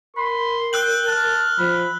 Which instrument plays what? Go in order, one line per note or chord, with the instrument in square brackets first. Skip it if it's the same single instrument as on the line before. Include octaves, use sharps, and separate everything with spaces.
[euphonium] A#4 [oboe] B5 [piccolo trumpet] C6
[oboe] G5 [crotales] E6 F#6 F#7
[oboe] A5 [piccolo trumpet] F6
[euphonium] F3 [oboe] B5